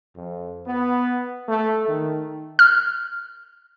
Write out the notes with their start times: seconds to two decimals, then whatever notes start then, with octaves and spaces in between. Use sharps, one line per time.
0.15 F2
0.66 B3
1.47 A3
1.87 D#3
2.59 F6